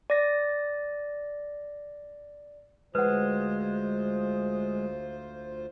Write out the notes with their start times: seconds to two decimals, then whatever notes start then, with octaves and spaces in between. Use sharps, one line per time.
0.10 D5 A#6
2.95 D2 G#3 F4 B4 C5 F#5